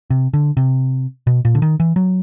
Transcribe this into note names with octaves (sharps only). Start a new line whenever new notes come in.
C3
D3
C3
B2
A#2
D3
D#3
E3
F#3